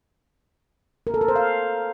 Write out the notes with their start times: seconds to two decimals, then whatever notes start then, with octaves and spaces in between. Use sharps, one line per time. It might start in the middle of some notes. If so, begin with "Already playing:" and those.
1.07 A#4
1.14 A4
1.21 A#4
1.28 C5
1.36 F5